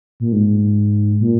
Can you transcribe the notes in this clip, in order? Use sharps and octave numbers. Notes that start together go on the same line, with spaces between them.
A#2
G#2
A#2